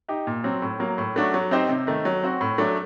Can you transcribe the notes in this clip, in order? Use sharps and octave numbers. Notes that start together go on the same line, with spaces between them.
D#4 G4
A#2
F#3 C4
A2
F#3 A#3
A2
F#3 A3 D4 F#4
F#3
C4 D#4 G4 C5
C3
D#3 A3
F#3
C4 F#4
A2
F#3 A3 D4